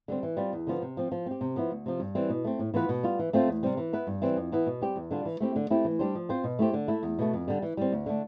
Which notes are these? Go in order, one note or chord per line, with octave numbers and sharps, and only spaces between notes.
D3 G3 C4
E3
G3 C4 F4
E2
D3 F3 B3 F4
C3
F3 C4
F3
C4 G4
C3
F3 B3 E4
D2
C3 F3
G2
E3 G3 C4
B2
A3 C4
A2
E3 B3 F4 B4
B2
G3 B3 F4
E3
A3 C4 F4 C5
E2
C3 G3 C4
E3
B3 E4 B4
G2
E3 G3 C4
F2
E3 B3 E4
B2
G3 C4 G4
E2
D3 G3 D4 F4
E3
A3 C4 E4 G4
D3
A3 C4 E4 G4
E3
G3 D4 G4 C5
F3
C4 F4 C5
B2
A3 E4 G4 C5
D3
A3 E4
E2
B2 A3
F2
D3 G3
E3
G3 C4
D2
D3 A3 D4